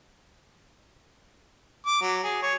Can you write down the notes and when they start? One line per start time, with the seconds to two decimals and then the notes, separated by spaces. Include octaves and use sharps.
1.87 D6
2.02 F#3
2.24 G#4
2.43 C#5